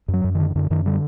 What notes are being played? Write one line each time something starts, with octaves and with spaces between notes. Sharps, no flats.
F#2
F#3
F#2
D3 D#3
F#2 D3
F#2 D#3
D3 G3